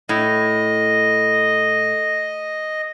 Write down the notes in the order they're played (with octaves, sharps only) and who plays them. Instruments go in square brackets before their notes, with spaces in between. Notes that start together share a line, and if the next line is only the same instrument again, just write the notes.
[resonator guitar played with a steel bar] A2 [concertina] D#5